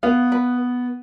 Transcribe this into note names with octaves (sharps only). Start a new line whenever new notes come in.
B3 F5
B4